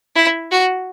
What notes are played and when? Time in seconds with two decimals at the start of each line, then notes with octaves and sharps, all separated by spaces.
0.16 E4
0.51 F#4